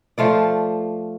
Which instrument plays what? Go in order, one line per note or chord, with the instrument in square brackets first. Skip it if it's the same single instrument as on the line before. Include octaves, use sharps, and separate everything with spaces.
[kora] F3 A3 F4 D5